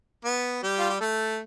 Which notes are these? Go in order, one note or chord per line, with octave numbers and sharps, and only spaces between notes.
B3
G3 G4
F4
G4
A3 A4